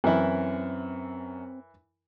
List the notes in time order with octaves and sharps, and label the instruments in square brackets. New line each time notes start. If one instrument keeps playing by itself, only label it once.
[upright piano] F#2 [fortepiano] E3 E4 [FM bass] C4